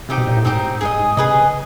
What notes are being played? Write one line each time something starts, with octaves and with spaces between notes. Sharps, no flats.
C3 C4 D#4 G4
B2
A#2
A2
G#2 C4 D#4 G4
G2 G#4 B4 D#5
G#2
C3 G#4 B4 D#5
C#3